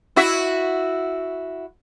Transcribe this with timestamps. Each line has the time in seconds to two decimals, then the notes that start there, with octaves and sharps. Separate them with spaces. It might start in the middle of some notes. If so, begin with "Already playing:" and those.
0.16 E4 F#4 E5